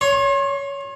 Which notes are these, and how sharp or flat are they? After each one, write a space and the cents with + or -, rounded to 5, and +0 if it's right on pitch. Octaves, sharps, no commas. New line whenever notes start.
C#5 +15 C6 +45